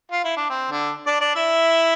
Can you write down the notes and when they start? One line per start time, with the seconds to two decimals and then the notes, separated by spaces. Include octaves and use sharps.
0.12 F4
0.24 E4
0.37 D4
0.50 C4
0.71 D3 D4
1.06 D4 D5
1.20 D4 D5
1.35 E4 E5